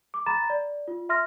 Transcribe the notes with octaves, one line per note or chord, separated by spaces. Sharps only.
D6
A#5 B5 A6 E7
D5
F4
E5 C6 F6 A#6